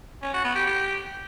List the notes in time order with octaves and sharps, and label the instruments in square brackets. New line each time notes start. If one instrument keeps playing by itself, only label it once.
[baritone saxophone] C#4
F#4
B3
G4
G4